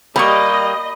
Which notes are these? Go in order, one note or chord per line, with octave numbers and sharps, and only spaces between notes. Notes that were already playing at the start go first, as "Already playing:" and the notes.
G3 A#3 G4 D#5 B5 C#6